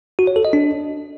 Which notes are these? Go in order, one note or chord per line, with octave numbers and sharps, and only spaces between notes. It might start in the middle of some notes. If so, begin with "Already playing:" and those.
F#4
C#5
A4
D#5
D4